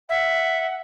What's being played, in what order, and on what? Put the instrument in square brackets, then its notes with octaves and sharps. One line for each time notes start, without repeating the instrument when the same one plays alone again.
[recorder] E5 [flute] F#5